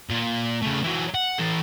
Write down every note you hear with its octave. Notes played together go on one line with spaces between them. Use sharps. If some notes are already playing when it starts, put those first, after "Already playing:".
A#2
C#3 A3
E3 F#3
F#5
E3 A4